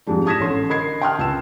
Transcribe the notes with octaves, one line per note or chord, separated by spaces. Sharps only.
F2 G#2 G3 G#3 D4
A5 D#6 G#6 A#6 B6 E7
A1 C#4 A4 C6
D3 A#4 D#5 B5 G#6 C7
G5 A5 C6 D#6 F6 F#6
C#2 A5 E6 E7